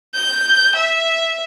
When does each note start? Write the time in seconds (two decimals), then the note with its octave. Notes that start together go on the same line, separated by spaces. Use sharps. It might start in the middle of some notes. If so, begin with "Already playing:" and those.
0.15 G6
0.76 E5